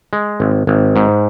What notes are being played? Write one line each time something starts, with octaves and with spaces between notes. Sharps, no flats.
G#3
G#1
G#1
G#2